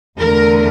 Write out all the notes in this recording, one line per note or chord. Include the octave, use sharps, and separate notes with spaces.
E2 D3 A3 A#4